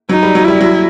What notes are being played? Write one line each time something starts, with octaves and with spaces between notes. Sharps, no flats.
F#3 D#4
G3
F#3
G3 E4
F#3